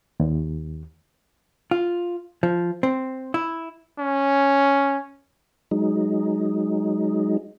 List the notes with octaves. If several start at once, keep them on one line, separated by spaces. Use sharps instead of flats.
D#2
F4
F3
C4
E4
C#4
F#3 G#3 D#4